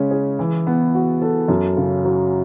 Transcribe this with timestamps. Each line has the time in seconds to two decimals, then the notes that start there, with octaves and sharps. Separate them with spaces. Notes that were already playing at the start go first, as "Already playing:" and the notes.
Already playing: C#3 G#3 C#4
0.11 G#4
0.39 E3
0.67 B3
0.95 F#4
1.22 A4
1.48 F#2
1.77 C#3
2.05 F#3